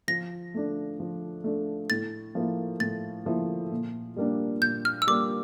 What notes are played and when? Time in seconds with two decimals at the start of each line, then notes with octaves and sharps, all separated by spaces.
0.08 F3 A#6
0.54 A3 D4
1.00 F3
1.44 A3 D4
1.90 A2 A6
2.35 F3 A#3 E4
2.80 A2 A6
3.26 F3 A#3 E4
3.72 A#2
4.17 G3 A#3 D4
4.61 A#2 G6
4.85 F6
5.02 E6
5.07 G3 A#3 D4 D6